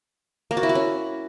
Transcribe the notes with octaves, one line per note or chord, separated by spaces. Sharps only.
A#3
F#4
E4
F#4
C#4